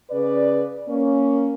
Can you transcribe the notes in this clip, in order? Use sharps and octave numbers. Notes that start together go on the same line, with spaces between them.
C#3 B4 D5
A#3 C#4